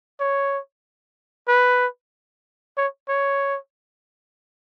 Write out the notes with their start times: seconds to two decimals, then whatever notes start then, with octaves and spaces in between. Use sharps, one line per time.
0.20 C#5
1.48 B4
2.77 C#5
3.08 C#5